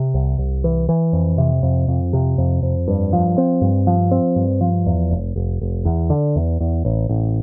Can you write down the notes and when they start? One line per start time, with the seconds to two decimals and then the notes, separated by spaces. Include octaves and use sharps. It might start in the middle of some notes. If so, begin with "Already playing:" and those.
Already playing: C3
0.14 C2
0.38 C2
0.64 E3
0.89 E3
1.13 F2
1.38 C3
1.63 F2
1.88 F2
2.13 C3
2.38 F2
2.63 F2
2.88 G2
3.13 F3
3.38 C4
3.61 G2
3.87 F3
4.11 C4
4.36 G2
4.61 F3
4.86 E2
5.11 F1
5.36 F1
5.61 F1
5.85 E2
6.10 D3
6.36 E2
6.60 E2
6.85 A1
7.09 A1